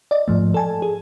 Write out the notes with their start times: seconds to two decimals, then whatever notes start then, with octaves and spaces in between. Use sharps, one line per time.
0.11 D5 D#5
0.28 G#2 F3 A3
0.54 A4 G#5 A5
0.82 G#4